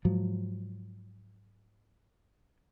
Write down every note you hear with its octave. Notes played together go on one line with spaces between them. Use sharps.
G#2 F3 F#3